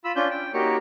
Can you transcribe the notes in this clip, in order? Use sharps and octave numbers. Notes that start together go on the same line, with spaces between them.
F4 B5 E6
C#4 D4 F4 G6
G5
A#3 D#4 F#4 G4 C#5